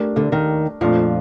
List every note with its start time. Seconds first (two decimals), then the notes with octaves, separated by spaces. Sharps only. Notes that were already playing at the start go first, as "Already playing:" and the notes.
Already playing: A3 D4 G4 A#4
0.16 D2 D3
0.32 D#2 D#3
0.81 F2 A#2 F3 A3 D4 F4